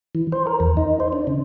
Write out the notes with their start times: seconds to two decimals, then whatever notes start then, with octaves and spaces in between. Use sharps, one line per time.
0.15 E3
0.32 C5
0.47 A#4
0.60 E2
0.77 D#4
1.00 C5
1.12 D4
1.27 C#3